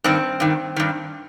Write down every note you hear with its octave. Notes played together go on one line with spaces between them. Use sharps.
G2 D#3 C4
G2 D#3
G2 D#3